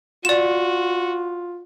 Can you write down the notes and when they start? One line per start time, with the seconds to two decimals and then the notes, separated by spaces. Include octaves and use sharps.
0.25 F4 F#4 D5 E7